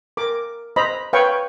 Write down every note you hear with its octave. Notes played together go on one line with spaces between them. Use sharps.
A#4 D6
C5 D#5 A#5 B5
B4 C#5 F5 G5 C#6